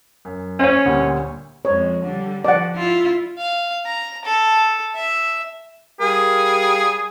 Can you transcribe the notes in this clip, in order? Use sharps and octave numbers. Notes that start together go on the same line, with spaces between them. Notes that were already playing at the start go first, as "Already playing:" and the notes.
F#2
C#4 C5 C#5 E5
D2 A#2 G3
F2 G#3 C#5
D3 G3
F3 D5 F#5
E4 F4
F5
A#5
A4
E5
G3 G#4 A#4 F5